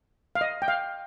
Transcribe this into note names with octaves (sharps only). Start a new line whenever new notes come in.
F5
D#5
G5
F5